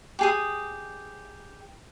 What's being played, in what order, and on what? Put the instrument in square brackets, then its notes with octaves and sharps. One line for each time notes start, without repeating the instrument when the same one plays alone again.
[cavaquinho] G4 G#4 D#6